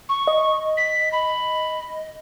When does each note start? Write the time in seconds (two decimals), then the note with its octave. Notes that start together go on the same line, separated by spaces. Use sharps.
0.09 C#6
0.27 D#5
0.77 B6
1.13 B5